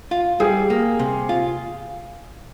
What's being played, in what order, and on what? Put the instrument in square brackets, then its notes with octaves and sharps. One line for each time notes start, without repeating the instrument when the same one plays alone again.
[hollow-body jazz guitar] F4
[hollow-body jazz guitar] G3 [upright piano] G#4
[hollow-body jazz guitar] A#3
C3
F4